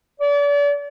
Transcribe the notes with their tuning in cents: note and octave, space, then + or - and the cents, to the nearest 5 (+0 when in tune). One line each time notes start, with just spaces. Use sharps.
D5 -35